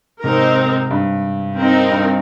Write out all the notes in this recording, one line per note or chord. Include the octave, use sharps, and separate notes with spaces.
G#2 C3 C4 D#4 A#4
G2
C4 D#4 A#4
G2